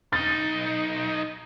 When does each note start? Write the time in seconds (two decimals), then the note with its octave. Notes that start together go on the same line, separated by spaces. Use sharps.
0.13 B1 D#4 A6